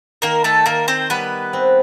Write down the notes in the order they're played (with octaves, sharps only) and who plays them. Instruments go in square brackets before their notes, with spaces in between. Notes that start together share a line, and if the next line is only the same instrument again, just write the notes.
[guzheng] D#3 [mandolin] A#3 A#4
[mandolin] A3 A4
[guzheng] D#3 [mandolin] A#3 A#4
[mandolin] C4 C5
[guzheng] G3 [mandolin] B3 B4
[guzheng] C4